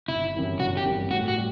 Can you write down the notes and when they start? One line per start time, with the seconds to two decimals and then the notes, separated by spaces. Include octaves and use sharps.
0.08 G1 E4
0.34 F#2 E3 G3
0.60 G1 F#4
0.77 G4
0.85 F#2 E3 G3
1.11 A2 F#4
1.28 F#4
1.37 G3